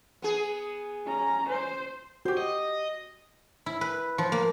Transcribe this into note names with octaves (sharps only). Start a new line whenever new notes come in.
B3 G#4
C#4 A#5
C5
F#4 G4 C5
D#5
E4
B4
F3
A#3